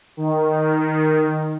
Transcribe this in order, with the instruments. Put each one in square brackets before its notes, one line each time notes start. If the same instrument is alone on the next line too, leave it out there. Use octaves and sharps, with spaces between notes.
[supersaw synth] D#3